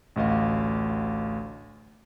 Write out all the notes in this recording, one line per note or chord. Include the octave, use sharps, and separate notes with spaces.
A1 D2 D#5 F5